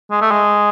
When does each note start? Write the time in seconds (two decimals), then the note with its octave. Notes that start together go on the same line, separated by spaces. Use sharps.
0.11 G#3
0.21 A3
0.31 G#3